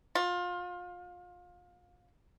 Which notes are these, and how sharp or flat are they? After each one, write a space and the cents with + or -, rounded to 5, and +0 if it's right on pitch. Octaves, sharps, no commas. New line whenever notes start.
F4 +25